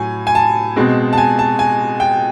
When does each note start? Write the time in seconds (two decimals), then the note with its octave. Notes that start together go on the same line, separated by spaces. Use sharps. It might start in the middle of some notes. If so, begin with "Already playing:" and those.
Already playing: A2 F#3 G#5
0.27 G#5
0.35 A5
0.76 B2 G#3 C4
1.13 A5
1.18 G#5
1.39 A5
1.59 G#5
2.00 G5